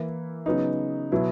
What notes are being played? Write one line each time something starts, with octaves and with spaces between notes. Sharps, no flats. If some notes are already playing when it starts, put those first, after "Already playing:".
Already playing: E3 A#3 E4
C#3 F#3 B3 D#4
B2 F#3 B3 E4